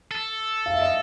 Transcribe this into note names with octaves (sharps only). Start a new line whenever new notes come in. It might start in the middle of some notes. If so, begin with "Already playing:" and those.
A4
F5
E5
D#5